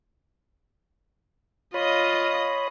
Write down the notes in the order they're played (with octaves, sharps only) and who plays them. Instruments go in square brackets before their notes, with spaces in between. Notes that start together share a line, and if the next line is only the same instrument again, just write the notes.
[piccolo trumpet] F4 [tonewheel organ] C#5 B5 [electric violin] D#5 D#6